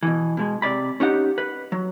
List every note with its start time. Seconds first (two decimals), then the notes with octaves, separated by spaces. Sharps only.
0.03 B2 E3
0.37 B2 G#3
0.62 C3 D5 B5
1.00 C#4 D#4 G4 F#5
1.38 B4
1.72 F#3